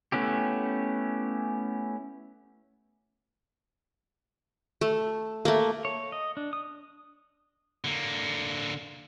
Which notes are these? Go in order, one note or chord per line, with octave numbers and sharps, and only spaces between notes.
A3 B3 C#4 E4 G4
A3
A3 A#3
C#5
D#5
D4
D#6
D3 A#3